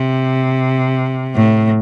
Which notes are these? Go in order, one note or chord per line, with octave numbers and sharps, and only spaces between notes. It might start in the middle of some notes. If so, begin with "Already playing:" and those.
Already playing: C3
A2